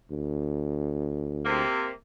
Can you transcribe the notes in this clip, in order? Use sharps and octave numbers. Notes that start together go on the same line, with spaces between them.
D2
C3 A#3